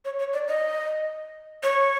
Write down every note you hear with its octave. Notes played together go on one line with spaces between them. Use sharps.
C#5
C#5
D5
D#5
C#5